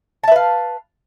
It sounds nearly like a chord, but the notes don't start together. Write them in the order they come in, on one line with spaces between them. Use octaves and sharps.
A5 E5 B4 F5